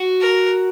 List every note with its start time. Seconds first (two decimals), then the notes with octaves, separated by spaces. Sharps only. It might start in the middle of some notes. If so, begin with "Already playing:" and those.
Already playing: F#4
0.21 A#4